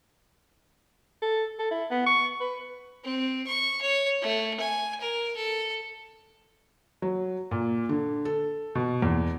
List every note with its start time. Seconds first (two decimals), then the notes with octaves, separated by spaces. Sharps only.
1.22 A4
1.59 A4
1.71 E4
1.91 B3
2.06 C#6
2.41 B4
3.04 C4
3.47 C#6
3.81 C#5
4.22 A3
4.60 G#5
5.01 A#4
5.36 A4
7.02 F#3
7.51 A#2
7.89 D3
8.25 A4
8.75 B2
9.02 E2